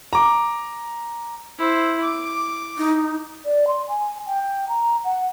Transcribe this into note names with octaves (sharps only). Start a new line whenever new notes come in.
A#5 D6
E4 C5
D6
D#4
D5
C6
G#5
G5
A#5
F#5